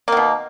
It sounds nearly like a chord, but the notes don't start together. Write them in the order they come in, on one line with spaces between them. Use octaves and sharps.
A#3 D#3 B2